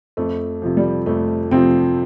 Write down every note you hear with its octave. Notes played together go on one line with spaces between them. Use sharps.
F2 A3
C3 F3
G3
F2 A3
C3 F3 C4